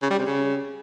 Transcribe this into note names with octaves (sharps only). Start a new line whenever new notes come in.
C#3
G3
C3
C#3